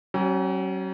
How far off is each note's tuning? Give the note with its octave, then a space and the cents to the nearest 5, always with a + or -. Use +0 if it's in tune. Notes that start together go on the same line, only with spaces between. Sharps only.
F#3 +40 C#4 -25